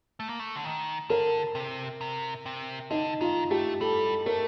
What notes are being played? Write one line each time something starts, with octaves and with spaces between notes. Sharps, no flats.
A3
A#3
A3
D3
D#3
D3 A#4
C3
C3
C3
D3 D#4
D#3 F4
A3 G4
G3 A4
A3 A#4